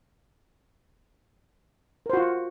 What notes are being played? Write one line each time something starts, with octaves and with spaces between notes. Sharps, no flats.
F4 F#4 A#4 C5